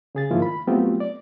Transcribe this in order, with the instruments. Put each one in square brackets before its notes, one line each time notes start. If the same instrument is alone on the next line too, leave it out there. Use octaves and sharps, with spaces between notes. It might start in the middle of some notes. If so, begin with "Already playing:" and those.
[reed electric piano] C#3 G#4 A6
G#2 D#3 F3 A#3 E4 F4
B5
F#3 A3 B3 C4 F4 G4
D5